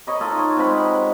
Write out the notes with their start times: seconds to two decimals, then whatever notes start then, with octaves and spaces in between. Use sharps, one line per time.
0.07 A#4 C#5 D#5 B5
0.20 D#4 F4 A4
0.39 C#5
0.57 C3 G#3 F#5 B5